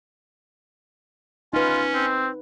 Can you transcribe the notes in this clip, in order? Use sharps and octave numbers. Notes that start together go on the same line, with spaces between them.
C#4 D#4 F4 B4
C4